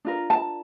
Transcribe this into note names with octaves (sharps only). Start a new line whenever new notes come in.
D4 F4 A#4
A5